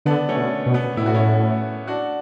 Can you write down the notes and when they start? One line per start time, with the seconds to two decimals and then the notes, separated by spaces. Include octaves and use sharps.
0.06 D3 B3 D4
0.29 A3 C#4
0.36 B2
0.66 B2
0.74 B3
0.97 A2 E4
1.06 F#4
1.14 C#4 E4
1.87 D4 F#4